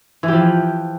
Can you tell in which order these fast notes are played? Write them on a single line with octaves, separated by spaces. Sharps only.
E3 G4 F3